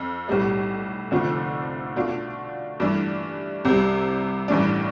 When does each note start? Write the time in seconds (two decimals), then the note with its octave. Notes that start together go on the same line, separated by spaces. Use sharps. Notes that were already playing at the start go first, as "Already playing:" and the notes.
Already playing: F2
0.28 B1 A2 G3 B3
1.11 F1 F2 D3 F3 A3
1.96 B2 A3 D4 F4
2.80 G2 E3 A3 D4
3.65 C2 C3 G3
4.48 A1 G2 E3 A3 D4